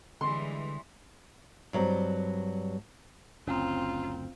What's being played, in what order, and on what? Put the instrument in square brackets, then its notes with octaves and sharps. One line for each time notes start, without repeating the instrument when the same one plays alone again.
[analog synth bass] D3 [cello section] E3 G3 G#3 [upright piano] C6
[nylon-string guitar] G2 F#3 G3 C4
[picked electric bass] F#1 D2 [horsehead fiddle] C4 [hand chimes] C#4 A#5 [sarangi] F4